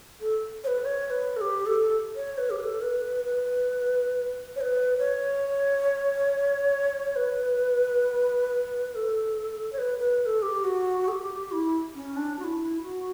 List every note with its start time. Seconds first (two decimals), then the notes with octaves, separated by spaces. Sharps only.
0.21 A4
0.64 C#5
0.67 B4
0.85 C#5
1.07 C#5
1.10 B4
1.36 A4
1.41 G4
1.66 A4
2.16 C#5
2.38 B4
2.50 G4
2.59 B4
2.63 A4
2.82 B4
3.25 B4
4.56 C#5
4.61 B4
4.98 C#5
7.16 B4
8.91 B4
8.95 A4
9.72 C#5
9.78 B4
9.99 B4
10.21 B4
10.26 A4
10.42 G4
10.64 F#4
11.08 A4
11.12 G4
11.52 E4
11.95 C#4
12.16 D4
12.39 F#4
12.44 E4
12.82 F#4